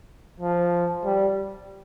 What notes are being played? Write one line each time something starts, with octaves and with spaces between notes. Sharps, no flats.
F3
G3